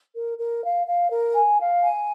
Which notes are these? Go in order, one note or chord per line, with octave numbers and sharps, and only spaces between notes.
A#4
A#4
F5
F5
A#4
G#5
F5
G#5